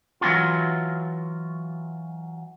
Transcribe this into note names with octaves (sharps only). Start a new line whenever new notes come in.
E3 F#3 C#4 D#4 F4